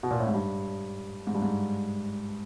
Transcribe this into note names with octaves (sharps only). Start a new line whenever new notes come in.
B2
A#2
A2
G#2
G2
G#2
G2
G#2